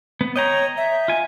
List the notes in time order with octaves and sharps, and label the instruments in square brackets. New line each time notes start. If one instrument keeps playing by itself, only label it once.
[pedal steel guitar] B3
[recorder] C#5 [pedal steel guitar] D#5 G5 A#5
[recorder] E5
[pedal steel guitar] F4 G#5